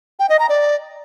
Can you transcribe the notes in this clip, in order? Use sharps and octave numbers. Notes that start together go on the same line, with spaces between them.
G5
D#5
A#5
D5